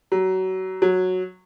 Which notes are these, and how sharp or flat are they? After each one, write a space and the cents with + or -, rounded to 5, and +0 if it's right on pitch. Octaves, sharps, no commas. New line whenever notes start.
F#3 +25
F#3 -5